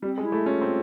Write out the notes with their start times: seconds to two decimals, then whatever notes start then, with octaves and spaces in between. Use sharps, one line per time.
0.02 G3 C4
0.18 G#3
0.24 E4
0.32 A3
0.46 C#4 F4
0.61 C4